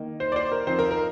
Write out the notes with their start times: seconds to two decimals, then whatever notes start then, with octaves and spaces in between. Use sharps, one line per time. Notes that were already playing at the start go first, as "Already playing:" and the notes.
Already playing: D#3 A#3 D#4
0.20 C5
0.32 D5
0.36 C5
0.52 A#4
0.67 F3 C4 D#4 C5
0.79 A#4
0.91 A#4